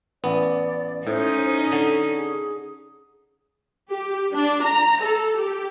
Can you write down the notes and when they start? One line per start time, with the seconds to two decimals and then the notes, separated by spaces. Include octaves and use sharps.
0.24 A1 B3 D5
1.07 A2 C#4 D#4 C5
1.72 D3 A4
2.17 G#4
3.90 G4
4.33 D4
4.64 A#5
5.02 A4
5.39 G4